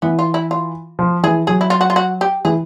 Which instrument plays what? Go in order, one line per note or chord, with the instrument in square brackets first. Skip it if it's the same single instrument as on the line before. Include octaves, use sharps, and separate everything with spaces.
[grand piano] E3 [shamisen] B3
[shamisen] F4
E4
F4
[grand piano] F3
[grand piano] E3 [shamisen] G#4
[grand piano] F#3 [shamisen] G#4
[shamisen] E4
F4
F#4
F4
F#4
G4
[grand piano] E3 [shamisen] G#4